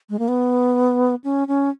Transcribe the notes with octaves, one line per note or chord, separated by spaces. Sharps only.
G#3
A#3
B3
C#4
C#4